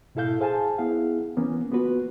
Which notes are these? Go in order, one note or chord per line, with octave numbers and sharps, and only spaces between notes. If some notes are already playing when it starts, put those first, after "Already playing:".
G#2 B2 E4 A4 F5 G6
G#4 C5 F5 G#5 A5
B3 E4 G#4 F5 F#5
E3 A#3 B3 C#4
A#3 B3 F4 F#4 B4